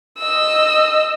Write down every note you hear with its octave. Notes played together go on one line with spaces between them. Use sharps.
D#5 E6